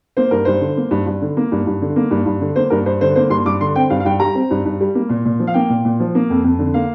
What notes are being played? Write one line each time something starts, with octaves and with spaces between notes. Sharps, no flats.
A#3 C5
G2 A#4
G2 C5
D3
A#3
G2
G2
D3
A#3
G2
G2
D3
A#3
G2
G2
D3
A#3 C5
G2 A#4
G2 C5
D3 C5
A#3 C5
G2 C6
G2 D6
D3 C6
C4 G5
G2 F5
F5
G2 G5
G3 A#5
C4
G2
G2
G3
A#3
A#2
A#2
F3
F5
A#3 G5
A#2
A#2
F3
A#3
F2
F2
D3
A#3 F5